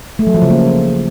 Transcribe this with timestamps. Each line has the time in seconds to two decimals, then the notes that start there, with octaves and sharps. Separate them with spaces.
0.19 A3
0.27 F#3
0.35 F3
0.42 C#3
0.50 A#3